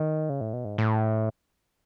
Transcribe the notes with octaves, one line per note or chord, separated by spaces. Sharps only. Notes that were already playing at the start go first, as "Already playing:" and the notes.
Already playing: D#3
C#3
A2
B2
G#2
A2